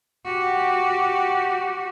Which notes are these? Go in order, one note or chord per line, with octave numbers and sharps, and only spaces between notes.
F#4 G4